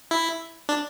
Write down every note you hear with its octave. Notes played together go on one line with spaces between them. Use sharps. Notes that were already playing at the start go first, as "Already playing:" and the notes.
E4
D4